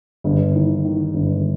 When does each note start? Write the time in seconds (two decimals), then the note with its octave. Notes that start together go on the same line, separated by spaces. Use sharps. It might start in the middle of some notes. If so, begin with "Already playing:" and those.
0.24 G1
0.55 D#3
0.84 D#3
1.14 G1